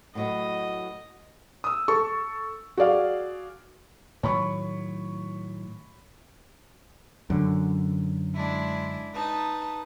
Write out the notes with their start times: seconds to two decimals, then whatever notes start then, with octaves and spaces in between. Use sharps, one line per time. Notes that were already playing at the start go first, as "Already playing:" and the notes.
0.15 A2 F#3 B3 D#5
1.64 D#6 E6
1.88 A4 C#6
2.77 F#4 G#4 D5 F5
4.23 A2 D#3 F#3 C#5 B5 C#6
7.30 F#2 D3
8.35 G#3 D4 E4
9.14 D#4 B4 A5